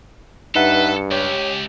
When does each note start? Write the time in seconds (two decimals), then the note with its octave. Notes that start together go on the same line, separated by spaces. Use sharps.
0.55 G2 D#4 A4 B4 E5 F#5
1.11 C#2 G4 C#5